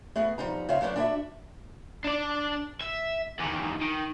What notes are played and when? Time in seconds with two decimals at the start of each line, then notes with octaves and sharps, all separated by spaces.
0.16 A3 B3 G#4
0.38 F3 G3 D#4 A#5
0.69 C#3 C4 C#5 E5 F5
0.81 F#3 A3 B3 C#4 D4
0.96 D4 E4 F#4 C#5 D5 E5
2.05 D4 D5
2.81 E5
3.39 E2 D#3
3.82 D#3